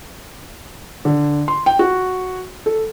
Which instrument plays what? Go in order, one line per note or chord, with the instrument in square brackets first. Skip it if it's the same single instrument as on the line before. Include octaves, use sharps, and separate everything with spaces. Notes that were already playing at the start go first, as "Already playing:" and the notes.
[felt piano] D3
C6
G5
F#4
A4